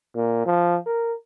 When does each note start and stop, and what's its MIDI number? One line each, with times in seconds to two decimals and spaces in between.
0.15 0.41 46
0.46 0.77 53
0.86 1.13 70